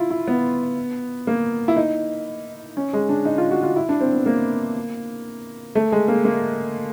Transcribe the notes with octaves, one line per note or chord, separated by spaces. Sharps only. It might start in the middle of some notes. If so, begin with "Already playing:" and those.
Already playing: E4 F4
E4
B3
A#3
E4
D#4
C#4
G#3
D4
D#4
F4
F#4
F4
E4
D4
C4
B3
A#3
A3
G#3
A#3
A#3